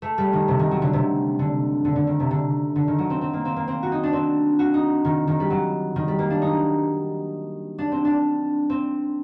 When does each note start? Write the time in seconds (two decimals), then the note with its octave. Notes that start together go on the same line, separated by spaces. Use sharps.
0.02 A3
0.18 G3
0.33 D#3
0.48 C3
0.59 D#3
0.71 F#3
0.82 D3
0.93 C3
1.39 D3
1.85 D3
1.96 D3
2.07 D#3
2.20 C3
2.31 D3
2.76 D3
2.88 D#3
2.99 F#3
3.10 C4
3.21 C4
3.33 A#3
3.45 C4
3.56 A#3
3.68 C4
3.83 F#4
3.92 D#4
4.03 D4
4.13 C4
4.59 F#4
4.74 D#4
5.05 D#3
5.28 D#3
5.40 G3
5.50 F#3
5.96 D#3
6.08 G3
6.19 A#3
6.30 D4
6.42 D#4
7.78 D4
7.92 C4
8.05 D4
8.70 C4